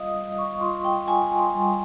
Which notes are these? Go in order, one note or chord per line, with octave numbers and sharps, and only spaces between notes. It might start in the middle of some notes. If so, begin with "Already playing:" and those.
Already playing: G3 F4 D#5 F5 D#6
G3
C#6
F4 C6
G5
F4 G#5
C6
G3